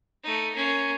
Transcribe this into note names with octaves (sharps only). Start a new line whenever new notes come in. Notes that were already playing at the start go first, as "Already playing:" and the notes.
A3 D#4
A#3 C#4